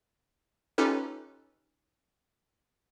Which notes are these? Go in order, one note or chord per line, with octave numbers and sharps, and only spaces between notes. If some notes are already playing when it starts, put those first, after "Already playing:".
C#4 D#4 F4 G4 A4 B4